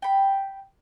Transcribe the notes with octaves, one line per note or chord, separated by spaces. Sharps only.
G5 B5